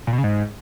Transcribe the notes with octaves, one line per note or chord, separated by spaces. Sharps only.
A#2
B2
C#3
G#2